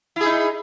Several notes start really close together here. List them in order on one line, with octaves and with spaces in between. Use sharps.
E4 G#4 D#4